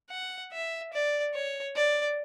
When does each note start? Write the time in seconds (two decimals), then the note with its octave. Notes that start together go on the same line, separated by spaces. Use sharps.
0.11 F#5
0.53 E5
0.93 D5
1.34 C#5
1.75 D5